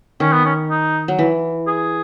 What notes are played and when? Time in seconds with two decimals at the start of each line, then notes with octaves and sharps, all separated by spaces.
0.20 D#3 C#4
0.33 B3
0.46 C#4
0.70 D#4
1.08 F#3
1.19 E3
1.67 G#4